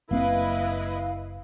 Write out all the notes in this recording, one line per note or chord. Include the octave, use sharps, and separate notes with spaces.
F#1 A#3 C4 E4 B4 D#5 F5